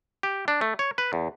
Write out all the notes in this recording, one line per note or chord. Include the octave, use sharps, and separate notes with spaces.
G4
D4
A3
C#5
B4
E2